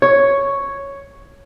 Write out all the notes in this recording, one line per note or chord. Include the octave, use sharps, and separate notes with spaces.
C#5